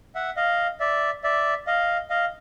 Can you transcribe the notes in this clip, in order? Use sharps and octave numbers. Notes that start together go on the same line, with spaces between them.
E5 F#5
D#5 F5
D5 E5
D5 E5
D#5 F5
D#5 F5